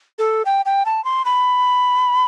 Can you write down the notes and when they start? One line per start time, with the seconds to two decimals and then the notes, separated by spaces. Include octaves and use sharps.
0.19 A4
0.45 G5
0.65 G5
0.86 A5
1.04 C6
1.25 B5